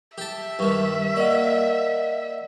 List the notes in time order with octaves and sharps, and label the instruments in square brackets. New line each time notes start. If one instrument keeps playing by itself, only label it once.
[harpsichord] G4 A5 [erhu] E5
[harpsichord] G2 D#3 [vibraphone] C#6
[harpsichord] A#3 [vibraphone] D5 D#5 F#5